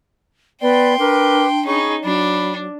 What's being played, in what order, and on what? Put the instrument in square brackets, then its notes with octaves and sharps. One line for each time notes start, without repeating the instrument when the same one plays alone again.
[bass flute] B3 [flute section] B4 D5 B5 [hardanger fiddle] G5 C6
[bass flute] D4 [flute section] A#4 B4 D6
[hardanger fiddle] C#4 D#4 [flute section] G#4 B5 C#6
[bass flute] F#3 [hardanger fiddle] D4 [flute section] B5